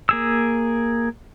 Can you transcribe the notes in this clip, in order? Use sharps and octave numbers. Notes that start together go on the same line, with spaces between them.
A#3 G#4 E6